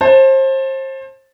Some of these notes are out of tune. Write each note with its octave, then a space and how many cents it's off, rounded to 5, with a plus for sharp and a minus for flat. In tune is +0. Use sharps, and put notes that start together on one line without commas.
C5 +30 A5 +0